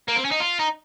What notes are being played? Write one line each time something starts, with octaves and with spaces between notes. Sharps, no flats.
A#3
C4
C#4
D#4
F4
D#4